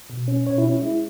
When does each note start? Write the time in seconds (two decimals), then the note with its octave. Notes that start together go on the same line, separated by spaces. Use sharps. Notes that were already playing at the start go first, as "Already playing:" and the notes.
0.10 B2
0.28 C#4
0.46 B2 C#5
0.58 E4
0.64 C#4
0.70 E4
0.82 G#3 E4